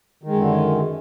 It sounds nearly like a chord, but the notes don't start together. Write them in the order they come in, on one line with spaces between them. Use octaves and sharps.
D#3 G#3 F#2 D3